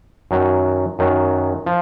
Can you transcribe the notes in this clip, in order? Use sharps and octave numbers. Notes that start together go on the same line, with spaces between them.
F#2 D#3 F#3
F#2 D#3 F#3
F3